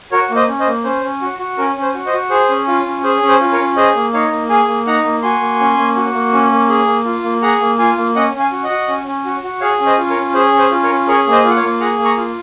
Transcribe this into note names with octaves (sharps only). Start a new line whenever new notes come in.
F#4 A#4 C#5
A#3
C5 D#5
C#4
C5 D#5
A#3
C#4 C5
C#4
F#4
F#4
C#4 A#4
C#4
C5
F#4
C5 D#5
F#4
G#4 C5
C#4
F4
C#4
G#4 C5
C#4
C5
F4
A#4 C#5
C#4
G#4 C5 D#5
A#3
D#4 C#5 F5
A#3
G#4 F5 G#5
A#3
D#4 F#5 A#5
A#3
F#4 G#5 C6
A#3
C#4
A#3
F#4
A#3
C#4
A#3
G#4
A#3
F4
A#3
G#4 F#5 A#5
A#3
F4 F5 G#5
A#3
C#4 D#5 F#5
C#4
F5 G#5
F#4
D#5 F#5
F#4
C#4
C#4
F#4
F#4
G#4 C#5 F5
C#4
C5 D#5
F4
A#4 C#5
C#4
G#4 C5
C#4
C5
F4
A#4 C#5
C#4
G#4 A#4 C#5
A#3
C5 D#5
F4
F#5
C#5 F5
A#3
G#4 F#5 A#5
A#3
A#5 C#6
F4